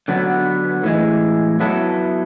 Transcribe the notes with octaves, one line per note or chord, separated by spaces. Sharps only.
D3 F#3 B3
A2 E3 G#3
F#3 B3 E4 A4